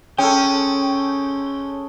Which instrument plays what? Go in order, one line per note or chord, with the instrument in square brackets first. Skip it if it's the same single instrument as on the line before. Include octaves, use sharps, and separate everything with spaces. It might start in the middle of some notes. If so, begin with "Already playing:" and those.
[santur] G#3 A4 [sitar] C#4 [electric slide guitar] G5